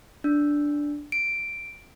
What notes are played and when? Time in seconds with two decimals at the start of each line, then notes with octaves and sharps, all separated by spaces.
0.24 D4
1.12 D7